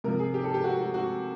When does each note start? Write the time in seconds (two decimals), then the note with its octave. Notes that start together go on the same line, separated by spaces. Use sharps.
0.04 C3 F3 A#4
0.19 G#4
0.34 G4
0.44 A4
0.54 G4
0.64 F#4
0.79 F#4
0.94 F#4